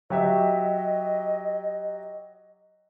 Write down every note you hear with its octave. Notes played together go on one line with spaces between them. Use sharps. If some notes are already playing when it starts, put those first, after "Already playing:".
F#3 G4 D#5 E5